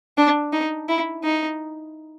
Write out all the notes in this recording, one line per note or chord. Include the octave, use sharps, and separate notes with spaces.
D4
D#4
E4
D#4